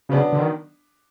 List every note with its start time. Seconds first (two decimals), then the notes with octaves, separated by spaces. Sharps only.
0.09 C#3 F#3 B3 D4
0.32 D3
0.39 D#3